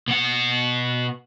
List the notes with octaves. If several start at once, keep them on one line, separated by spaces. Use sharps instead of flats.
B2 F#5